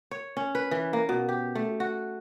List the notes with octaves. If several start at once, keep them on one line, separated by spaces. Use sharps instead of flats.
C#5
C#4
B4
E3
A#3
B2
G4
A3
F#4